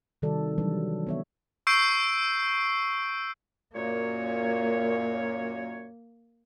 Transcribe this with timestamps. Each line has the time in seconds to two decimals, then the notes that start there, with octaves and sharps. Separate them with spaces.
0.22 C3 D#3 G3 F#4 A4 D5
0.58 E3 F#3 G3 D4 B4
1.07 B3 C#5 E5
1.67 C#6 E6 G6 C7 D7
3.75 F#2 A#2 A#3 C#5